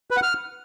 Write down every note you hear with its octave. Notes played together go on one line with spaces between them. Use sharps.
B4
F#5
F6